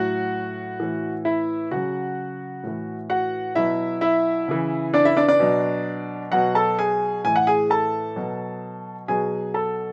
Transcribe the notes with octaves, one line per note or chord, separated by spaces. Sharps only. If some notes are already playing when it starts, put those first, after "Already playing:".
Already playing: A2 F#3 F#4 F#5
A2 E3
E4 E5
C#3 F#3 F#4 F#5
A2 E3
F#4 F#5
B2 F#3 E4 E5
E4 E5
C#3 E3
D4 D5
E4 E5
D4 D5
D4 D5
B2 F#3
B2 F#3 F#4 F#5
A4 A5
G#4 G#5
A2 E3 G#5
F#5
G#4 G#5
A4 A5
B2 F#3
B2 F#3 G#4 G#5
A4 A5